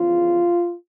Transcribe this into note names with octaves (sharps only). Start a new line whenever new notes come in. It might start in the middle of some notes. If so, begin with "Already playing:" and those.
Already playing: E2 C#3 F3 F4